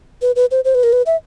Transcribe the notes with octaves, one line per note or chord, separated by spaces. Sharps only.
B4
B4
C5
C5
B4
A#4
B4
E5